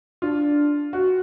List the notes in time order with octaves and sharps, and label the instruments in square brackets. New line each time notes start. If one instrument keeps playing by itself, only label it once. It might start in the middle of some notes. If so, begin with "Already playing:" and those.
[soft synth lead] D4 [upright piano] F4
[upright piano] F#4